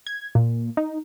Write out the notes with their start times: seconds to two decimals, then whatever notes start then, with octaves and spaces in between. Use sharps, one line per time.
0.07 G#6
0.35 A#2
0.77 D#4